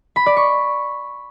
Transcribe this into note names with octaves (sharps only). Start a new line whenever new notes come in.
B5
D5
C#6